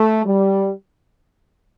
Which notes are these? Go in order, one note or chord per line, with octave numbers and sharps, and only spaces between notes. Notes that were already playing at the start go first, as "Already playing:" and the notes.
Already playing: A3
G3